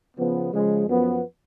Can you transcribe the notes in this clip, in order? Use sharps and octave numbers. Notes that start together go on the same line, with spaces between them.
C#3 F3 B3
C#3 F3 G#3
F#2 F3 B3